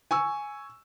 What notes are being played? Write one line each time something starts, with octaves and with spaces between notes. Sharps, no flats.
G#5 C#6 E6